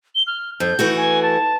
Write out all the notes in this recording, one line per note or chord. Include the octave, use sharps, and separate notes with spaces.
G7
F6
F2 G6
E3 A3 F#4
G#5
A5